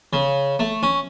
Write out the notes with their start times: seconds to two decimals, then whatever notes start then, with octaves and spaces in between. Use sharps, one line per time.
0.13 C#3
0.59 A3
0.83 C#4